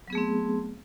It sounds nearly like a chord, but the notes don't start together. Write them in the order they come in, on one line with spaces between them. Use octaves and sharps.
F#3 B3 G#4 A3 C4